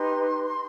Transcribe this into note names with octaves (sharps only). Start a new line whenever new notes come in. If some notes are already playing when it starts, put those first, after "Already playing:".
Already playing: D#4 G4 B4 C6